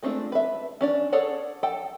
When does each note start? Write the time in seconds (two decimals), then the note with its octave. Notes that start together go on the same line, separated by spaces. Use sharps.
0.03 G#3 A3 C4 D4 F4
0.32 B4 E5
0.81 C#4 D4 D5
1.12 G#4 A4 C#5 D5 F#5
1.63 A4 G5